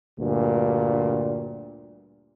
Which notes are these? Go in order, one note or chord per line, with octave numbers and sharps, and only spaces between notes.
D2 G2 A#2